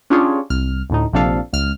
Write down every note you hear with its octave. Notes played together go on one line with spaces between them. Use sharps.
C#4 D4 F4 G4 G#4 C#5
C2 F6
D2 A2 D#4
A#1 C3 F3 D4 A4 F5
C#2 F6